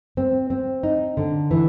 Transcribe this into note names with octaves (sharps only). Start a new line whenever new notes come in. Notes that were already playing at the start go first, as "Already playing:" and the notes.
C4
C4
D#4
D3
E3